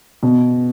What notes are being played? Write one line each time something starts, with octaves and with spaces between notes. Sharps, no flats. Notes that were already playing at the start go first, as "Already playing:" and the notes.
B2